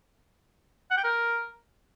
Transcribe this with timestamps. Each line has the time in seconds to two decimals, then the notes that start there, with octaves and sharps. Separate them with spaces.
0.91 F#5
0.97 G5
1.04 A#4